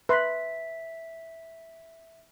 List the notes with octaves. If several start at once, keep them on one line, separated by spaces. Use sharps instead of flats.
B4 E5 C6 B6